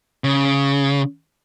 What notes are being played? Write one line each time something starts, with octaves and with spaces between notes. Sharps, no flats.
C#3